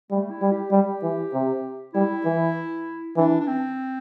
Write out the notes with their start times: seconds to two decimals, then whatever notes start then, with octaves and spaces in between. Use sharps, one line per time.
0.11 G3 A3
0.31 E4
0.42 G3
0.52 G4
0.71 G3 G4
1.03 E3
1.33 C3
1.94 G3 E4
2.25 E3
3.17 E3 D4
3.41 D4
3.47 C4